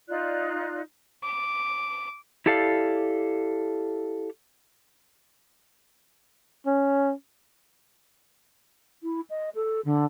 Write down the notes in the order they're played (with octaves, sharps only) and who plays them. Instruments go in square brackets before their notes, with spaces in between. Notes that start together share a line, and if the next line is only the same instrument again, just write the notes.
[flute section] D#4 F4 D5 F#6
[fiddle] D6
[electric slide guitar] E4 G4 A4 D5 F5
[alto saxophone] C#4
[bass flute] E4
D#5
A4
D3